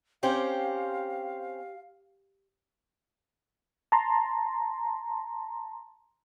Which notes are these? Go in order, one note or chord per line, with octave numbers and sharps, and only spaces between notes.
C4 C#4 G4 C5 F5
A5 A#5 C6